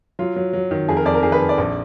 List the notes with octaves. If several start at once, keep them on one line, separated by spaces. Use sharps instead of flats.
F#3 F4
F#3
F#3
D#3
F2 G#4
A#4
F2 D5
A#4
D#3 G#4
B4
F2
D5
A#1